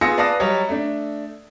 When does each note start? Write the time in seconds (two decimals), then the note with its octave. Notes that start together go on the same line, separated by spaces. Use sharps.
0.01 B3 F4 G#4 E6 A#6 C#7
0.17 B4 D5 F5 A5 D#6 A#6
0.40 F#3 G3 C#5 D#5
0.69 A3 D4